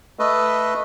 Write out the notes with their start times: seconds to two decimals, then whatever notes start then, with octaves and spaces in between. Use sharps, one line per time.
0.19 A3 A4 B4 D#5